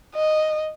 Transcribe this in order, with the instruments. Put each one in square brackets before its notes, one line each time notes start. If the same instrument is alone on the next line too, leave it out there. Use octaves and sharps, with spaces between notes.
[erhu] D#5